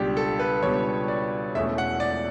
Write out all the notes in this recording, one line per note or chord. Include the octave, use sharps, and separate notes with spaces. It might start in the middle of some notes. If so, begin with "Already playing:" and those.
Already playing: C#2 B2 G3 D4 G4
A4
B4
C#2 B2 G3 D4 C#5
D5
E1 E2 B2 A3 C#4 E5
F#5
D5